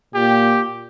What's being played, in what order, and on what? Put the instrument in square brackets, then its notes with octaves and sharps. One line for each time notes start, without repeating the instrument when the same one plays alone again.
[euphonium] A#2 [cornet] G4